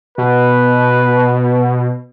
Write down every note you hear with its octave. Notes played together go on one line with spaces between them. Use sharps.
B2 B4